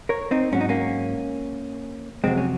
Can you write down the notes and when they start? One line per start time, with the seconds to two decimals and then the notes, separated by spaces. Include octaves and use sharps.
0.09 A#4 C#5
0.31 C4 D#4
0.52 G#2 F#3 C#4
0.61 D#4
0.69 A#3 C#4
2.24 F2 C3 F#3 G#3 C4
2.37 C#4